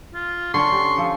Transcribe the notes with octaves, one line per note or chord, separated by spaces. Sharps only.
F4
D3 C#4 D4 C6 C#6
G4
F3 F4 A4